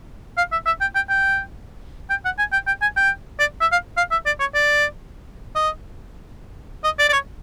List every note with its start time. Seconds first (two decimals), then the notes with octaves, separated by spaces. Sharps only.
0.38 F5
0.52 E5
0.66 E5
0.81 G5
0.95 G5
1.10 G5
2.10 G5
2.25 F#5
2.39 G#5
2.53 G5
2.67 G5
2.82 G#5
2.97 G5
3.40 D5
3.61 E5
3.72 F5
3.97 F5
4.11 E5
4.26 D5
4.40 C#5
4.55 D5
5.56 D#5
6.84 D#5
6.99 D5
7.09 D5
7.13 C#5